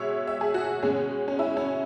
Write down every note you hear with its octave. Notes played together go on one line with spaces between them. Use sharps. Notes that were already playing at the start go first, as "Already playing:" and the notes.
Already playing: B2 G#3 C#5 E5
E5
G#4
F#4
B2 G#3 C#4
C#4
E4
C#4